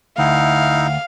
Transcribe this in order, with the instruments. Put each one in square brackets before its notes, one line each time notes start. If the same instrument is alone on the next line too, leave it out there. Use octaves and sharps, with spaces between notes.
[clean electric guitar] D2 [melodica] D#4 E4 [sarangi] F5